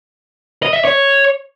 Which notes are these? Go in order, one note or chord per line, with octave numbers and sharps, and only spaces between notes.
D#5
E5
C#5